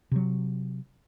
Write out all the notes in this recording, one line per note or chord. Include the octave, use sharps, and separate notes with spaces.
C3 F#3